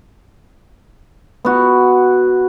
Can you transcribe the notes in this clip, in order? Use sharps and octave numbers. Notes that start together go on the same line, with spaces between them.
B3 F#4